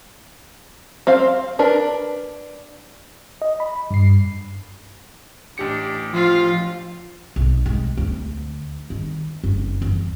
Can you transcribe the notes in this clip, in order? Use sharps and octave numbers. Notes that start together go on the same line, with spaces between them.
C4 C5 F5
D4 A#4 B4
D#5
B5
G2 C7
A1 D4 G4 C#7
F3 F4 F5
B1
G#3
D2
D#3
F#1
E2